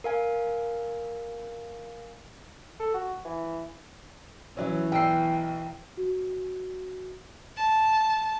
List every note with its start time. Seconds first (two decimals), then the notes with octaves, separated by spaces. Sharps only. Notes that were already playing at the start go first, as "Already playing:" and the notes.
0.04 A#4 F5 G#5
2.80 A4
2.94 F#4
3.25 E3
4.57 E3 F#3 C#4
4.92 B1 G5 E6 C7
5.97 F#4
7.56 A5